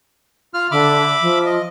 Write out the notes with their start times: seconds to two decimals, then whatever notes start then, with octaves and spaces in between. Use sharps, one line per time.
0.54 F4 F6
0.71 D3 E5 B5 D6
1.21 F3
1.46 D#5